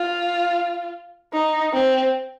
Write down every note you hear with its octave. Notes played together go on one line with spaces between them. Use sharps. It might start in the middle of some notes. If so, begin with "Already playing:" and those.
Already playing: F4
D#4
C4